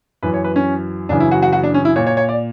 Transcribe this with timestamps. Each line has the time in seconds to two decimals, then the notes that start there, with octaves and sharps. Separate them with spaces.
0.23 F#2 E3 B4
0.34 C#5
0.44 B4
0.56 C#4
1.09 F#2 C#3 E3 D4
1.20 E4
1.31 F#4
1.42 F#4
1.52 F#4
1.63 D4
1.74 C#4
1.85 E4
1.96 A#2 C#5
2.07 C#5
2.17 C#5
2.29 D5